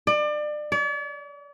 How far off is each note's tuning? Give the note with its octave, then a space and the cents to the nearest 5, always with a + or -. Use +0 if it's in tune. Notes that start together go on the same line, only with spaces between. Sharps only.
D5 +30
D5 -45